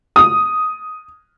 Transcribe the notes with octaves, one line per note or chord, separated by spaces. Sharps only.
D#6